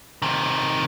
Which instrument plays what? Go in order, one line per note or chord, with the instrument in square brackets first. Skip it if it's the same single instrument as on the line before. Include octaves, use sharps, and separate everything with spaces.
[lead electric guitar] C3 D#3